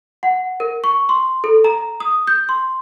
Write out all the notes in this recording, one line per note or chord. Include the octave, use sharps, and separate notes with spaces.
F#5
A#4
C#6
C6
A4
A#5
D#6
G6
C6